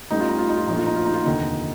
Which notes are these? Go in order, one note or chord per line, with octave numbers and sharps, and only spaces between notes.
A1 A2 G3 D#4
F4
D#4
F4
D#4
F4
A#1 A#2 F3 A3 D#4
F4
D#4
F4
D#4
F4
F1 D#2 D3 D#4